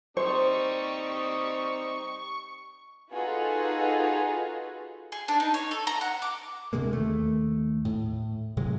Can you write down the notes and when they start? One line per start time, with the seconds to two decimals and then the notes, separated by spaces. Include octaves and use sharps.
0.17 G3 C4 D#4 C5 C#6
3.11 D#4 F4 F#4 G#4 A4 B4
5.12 G#4
5.28 D4
5.40 D#4
5.54 C#5
5.71 A4
5.87 A#5
6.01 F#5
6.22 D6
6.73 D2 C3 G#3 A#3
6.92 D#2 A3
7.85 A2
8.57 A2 C3 F#3 G#3